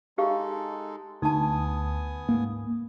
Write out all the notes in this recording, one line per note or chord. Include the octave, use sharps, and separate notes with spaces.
G#3 D#4 F#4 G4 A4 F5
D2 B3 D#4 G#5 A5 D#6
G#2 A#3